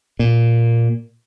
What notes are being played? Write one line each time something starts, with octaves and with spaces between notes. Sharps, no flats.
A#2